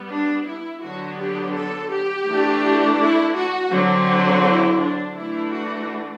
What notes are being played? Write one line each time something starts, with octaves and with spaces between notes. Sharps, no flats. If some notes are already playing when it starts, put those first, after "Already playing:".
Already playing: G3 B3
D4
E4
D3 F#3 B3 D4 F#4
G4
A4
G4
E3 A3 D4
E4
F#4
D3 F#3 C4
F#4
E4
D4
E3 A3 D4 E4
F#4